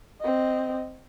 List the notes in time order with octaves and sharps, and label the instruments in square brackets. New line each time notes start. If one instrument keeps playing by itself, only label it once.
[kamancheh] C4 D#5